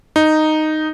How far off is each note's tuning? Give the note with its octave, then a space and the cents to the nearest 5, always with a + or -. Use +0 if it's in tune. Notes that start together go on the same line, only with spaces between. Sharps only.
D#4 -5